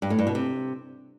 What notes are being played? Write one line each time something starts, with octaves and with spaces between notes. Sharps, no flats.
G2
A2
G2
B2
C3